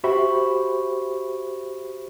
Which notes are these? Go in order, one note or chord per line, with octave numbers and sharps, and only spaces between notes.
F#4 G4 C5 E5 B5 C#6